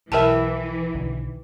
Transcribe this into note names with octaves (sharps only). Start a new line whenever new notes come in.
B1 E3 G4 A#4 B4 E5 G5 A5
B1 D3 D#3